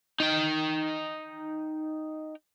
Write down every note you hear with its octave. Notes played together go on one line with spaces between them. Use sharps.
D#4 G5